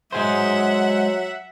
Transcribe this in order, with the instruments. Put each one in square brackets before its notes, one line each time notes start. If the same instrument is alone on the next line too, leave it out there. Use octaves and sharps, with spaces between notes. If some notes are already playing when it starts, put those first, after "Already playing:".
[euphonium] F#3 [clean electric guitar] G#3 G#4 C5 [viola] E5 F#5